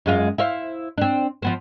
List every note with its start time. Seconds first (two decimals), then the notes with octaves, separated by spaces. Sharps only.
0.06 F#2 G#3 F4
0.38 E4 C5 F5
0.98 C4 D4
1.42 F3 B3 C4